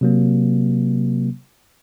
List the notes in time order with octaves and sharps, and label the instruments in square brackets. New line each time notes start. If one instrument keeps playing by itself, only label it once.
[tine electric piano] C3 F#3 A#3